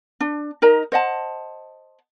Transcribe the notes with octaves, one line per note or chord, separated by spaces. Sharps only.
D4
D#4 A#4 D#5 A#5
C5 D#5 F#5 A5